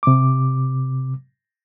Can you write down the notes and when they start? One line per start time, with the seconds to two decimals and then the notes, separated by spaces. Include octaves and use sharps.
0.03 C3 D6